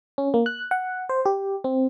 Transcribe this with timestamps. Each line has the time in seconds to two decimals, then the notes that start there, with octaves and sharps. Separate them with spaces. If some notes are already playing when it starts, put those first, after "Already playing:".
0.18 C#4
0.34 A#3
0.46 F#6
0.71 F#5
1.09 C5
1.26 G4
1.64 C4